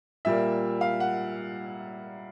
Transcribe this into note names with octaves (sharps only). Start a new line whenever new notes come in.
A#2 G3 A#3 E5
F5
F#5